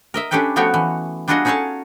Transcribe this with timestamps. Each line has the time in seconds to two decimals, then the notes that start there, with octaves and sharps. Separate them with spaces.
0.14 A#4 D#5 E5
0.31 C#4 D4 G4 A4 B4 G5
0.56 F3 A3 B3 F#4 C#5 G5
0.74 E3
1.28 G3 D4 F4 F#4 G#4 D#5
1.45 C#4 D#4 G#4 A4 C#5 A5